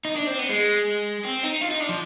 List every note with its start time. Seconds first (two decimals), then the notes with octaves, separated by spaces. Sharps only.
0.05 D#4
0.16 D4
0.27 C4
0.39 B3
0.50 G#3
1.24 C4
1.43 D#4
1.61 F4
1.71 D#4
1.80 D4
1.89 F3